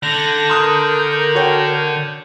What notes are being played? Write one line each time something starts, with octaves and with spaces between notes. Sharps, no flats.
D3 G6 A#6
A#4 C6 D#6 F#6
F#4 C#5 G5